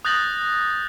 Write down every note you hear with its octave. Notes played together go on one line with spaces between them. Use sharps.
D#6 F#6 G6 A6 A#6 F#7